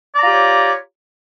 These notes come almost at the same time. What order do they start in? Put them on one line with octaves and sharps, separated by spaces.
D5 A#5 F4 G4 C#5